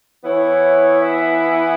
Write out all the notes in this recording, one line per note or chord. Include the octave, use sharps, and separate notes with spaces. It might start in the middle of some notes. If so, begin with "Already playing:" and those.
E3 B3 E4 C#5
E5